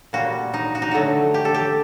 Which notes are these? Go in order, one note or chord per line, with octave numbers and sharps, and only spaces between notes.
A#2 G3 F#4
D#4
F#4
D#4
D3 F#3 A3 F#4
G4
A4
G4